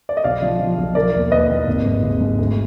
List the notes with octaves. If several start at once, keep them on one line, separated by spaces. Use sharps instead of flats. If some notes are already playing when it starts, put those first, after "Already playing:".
D5
D#5
B1 D5 F5
F3
F3
B1
F3 A#4 D5
D#2
D#2 B4 D#5
D#2
G#1
G#2
G#1
G#2
D2